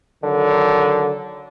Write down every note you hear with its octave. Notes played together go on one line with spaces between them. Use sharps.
D3 D#3 F#3